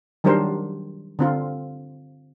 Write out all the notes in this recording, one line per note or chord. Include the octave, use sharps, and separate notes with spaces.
D#3 F#3 G3 D4 A#4 C5
D3 C4 F4